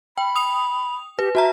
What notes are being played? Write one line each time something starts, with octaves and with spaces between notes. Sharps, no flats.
G5 B5
D#6 F7
G4 B4
F#4 E5 A5 A#5